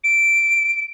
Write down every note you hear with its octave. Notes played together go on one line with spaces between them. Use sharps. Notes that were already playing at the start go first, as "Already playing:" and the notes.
D7